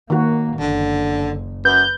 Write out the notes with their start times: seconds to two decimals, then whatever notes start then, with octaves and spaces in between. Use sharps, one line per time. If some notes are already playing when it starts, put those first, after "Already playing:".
0.10 D#3 A#3 F#4
0.59 F#1 D3
1.65 F#2 B4 G6